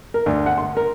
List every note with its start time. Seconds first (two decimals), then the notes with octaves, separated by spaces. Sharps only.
0.14 A#4
0.26 D2
0.46 F#5
0.58 C6
0.77 A#4